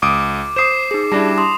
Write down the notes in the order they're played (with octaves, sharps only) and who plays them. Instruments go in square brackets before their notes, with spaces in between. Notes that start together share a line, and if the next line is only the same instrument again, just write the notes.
[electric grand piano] C#2 D#6 D7 [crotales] D6
[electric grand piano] C5 D#6 [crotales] D6 C7 E7
[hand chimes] D#4 G#4
[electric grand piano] G3 D4 E4 [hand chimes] A5 A#6
[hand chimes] C6 [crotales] D#6